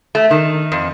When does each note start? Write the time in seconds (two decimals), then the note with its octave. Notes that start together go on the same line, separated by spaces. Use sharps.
0.15 A3
0.31 D#3
0.72 F2